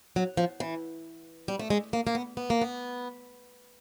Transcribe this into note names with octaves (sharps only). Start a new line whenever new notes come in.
F#3
F3
E3
G3
A3
G#3
A#3
A#3
B3
B3
A#3
B3